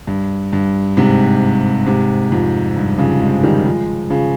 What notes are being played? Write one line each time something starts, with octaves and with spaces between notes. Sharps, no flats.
G2
G2
G#2 C3
G#2 C3
F2 G#2
G2
C#3 F3
F3 G#3
D#3 G3
F3 G#3
C#3 F3